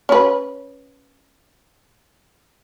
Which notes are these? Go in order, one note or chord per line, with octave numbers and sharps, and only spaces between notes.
C#4 B4